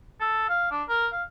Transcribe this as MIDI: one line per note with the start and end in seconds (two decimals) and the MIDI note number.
0.21 0.47 69
0.49 0.67 77
0.71 0.83 62
0.89 1.07 70
1.12 1.23 77